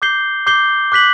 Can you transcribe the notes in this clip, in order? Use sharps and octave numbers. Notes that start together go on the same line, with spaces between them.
D6 G6 C7 G7
D6 G6 C7 G7
D6 F#6 B6 F#7